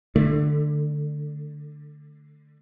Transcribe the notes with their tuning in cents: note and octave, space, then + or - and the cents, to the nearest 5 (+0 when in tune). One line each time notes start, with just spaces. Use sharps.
D3 +15 A3 +0